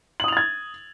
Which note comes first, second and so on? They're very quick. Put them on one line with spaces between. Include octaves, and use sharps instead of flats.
F#7 D#6 F7 A6 G#6